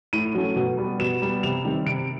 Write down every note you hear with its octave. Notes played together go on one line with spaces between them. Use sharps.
A2 D#7
F#3 A3 C#4
B2
G3 B3
B2 E7
G3 B3
C3 F7
D#3 G3 C4
C3 D7